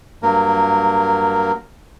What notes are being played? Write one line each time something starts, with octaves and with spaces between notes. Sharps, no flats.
G2 F#3 A#3 A#4